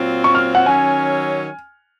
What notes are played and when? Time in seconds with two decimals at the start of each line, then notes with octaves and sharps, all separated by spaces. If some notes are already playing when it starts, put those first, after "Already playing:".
Already playing: A#2 F#3 C4 F4
0.24 C#6
0.35 F6
0.55 F#5
0.66 D#3 F#3 C#4 G#5